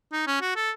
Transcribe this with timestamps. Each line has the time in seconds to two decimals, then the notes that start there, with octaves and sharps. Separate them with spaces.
0.12 D#4
0.27 C#4
0.41 F#4
0.56 A4